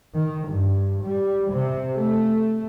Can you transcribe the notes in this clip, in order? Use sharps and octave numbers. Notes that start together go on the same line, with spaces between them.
D#3
G2
G3
C3
A3